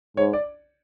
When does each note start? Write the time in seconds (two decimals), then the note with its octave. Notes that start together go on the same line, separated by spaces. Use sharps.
0.17 G#2 C#5
0.33 D5